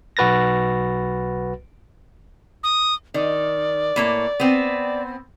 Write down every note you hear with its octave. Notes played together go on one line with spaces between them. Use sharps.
B1 F#4 B4 A6 A#6
D#6
D#3 D5
A2 A#3 C#5
B3 C4